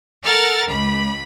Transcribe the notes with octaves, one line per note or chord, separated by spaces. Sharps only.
A4 A#4 F#5 F6 A6
C#2 B5